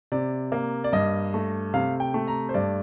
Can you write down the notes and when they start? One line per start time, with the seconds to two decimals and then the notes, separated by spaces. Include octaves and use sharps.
0.12 C3 D5
0.52 A#3
0.84 D5
0.93 G2 D#5
1.34 A3
1.74 C3 F5
2.00 G5
2.14 A3
2.28 A#5
2.49 C5
2.54 G2 D5